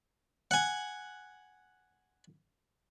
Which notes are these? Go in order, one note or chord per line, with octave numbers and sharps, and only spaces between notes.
F#5 G#5